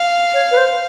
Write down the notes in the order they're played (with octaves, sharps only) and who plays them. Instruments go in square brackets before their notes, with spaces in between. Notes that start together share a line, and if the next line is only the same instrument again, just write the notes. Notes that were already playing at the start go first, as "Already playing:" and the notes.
Already playing: [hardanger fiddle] F5
[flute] C#5
B4
C5